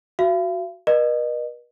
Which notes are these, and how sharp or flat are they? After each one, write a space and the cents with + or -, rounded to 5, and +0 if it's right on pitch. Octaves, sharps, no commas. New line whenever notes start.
F#4 +0 F5 -45
B4 -45 D#5 -35